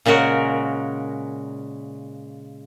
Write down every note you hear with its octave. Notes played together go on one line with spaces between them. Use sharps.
A#2 C#3 G#3 F#4 A#4